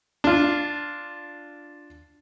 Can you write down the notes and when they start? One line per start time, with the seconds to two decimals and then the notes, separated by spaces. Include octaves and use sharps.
0.24 D4 F4